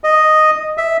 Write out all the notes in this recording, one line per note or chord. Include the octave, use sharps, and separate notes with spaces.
D#5
E5